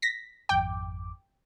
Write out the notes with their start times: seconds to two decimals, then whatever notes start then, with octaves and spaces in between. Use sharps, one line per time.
0.02 A#6 B6
0.49 G#1 F2 G5 D6